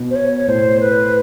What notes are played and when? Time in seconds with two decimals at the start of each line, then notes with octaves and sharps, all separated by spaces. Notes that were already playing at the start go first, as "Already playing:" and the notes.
Already playing: B2
0.11 C5
0.16 C#5
0.36 C#5
0.48 A2 C5
0.80 B4